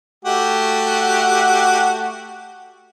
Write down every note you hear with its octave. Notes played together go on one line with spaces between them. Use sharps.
A3 F#4 G4